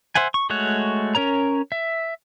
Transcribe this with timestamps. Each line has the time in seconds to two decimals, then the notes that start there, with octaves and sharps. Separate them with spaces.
0.15 C5 E5 F#5 G#5
0.34 C#6
0.50 G#3 A3 F#4 C#5 F#6
1.15 C#4 A#4 C#5 A#5
1.72 E5